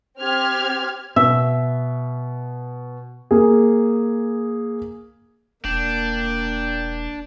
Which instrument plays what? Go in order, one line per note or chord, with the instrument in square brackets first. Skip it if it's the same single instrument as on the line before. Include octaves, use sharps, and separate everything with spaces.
[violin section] C4 G4 F6 G#6
[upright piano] B2 [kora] E5
[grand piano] A#3 G#4
[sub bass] E1 [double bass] A#3 [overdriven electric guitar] D4 [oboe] G5